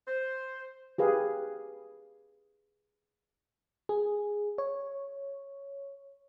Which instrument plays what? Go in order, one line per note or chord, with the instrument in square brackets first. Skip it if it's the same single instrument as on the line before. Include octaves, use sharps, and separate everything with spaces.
[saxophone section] C5
[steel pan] G4 G#4 B4 F5
[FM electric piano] G#4
C#5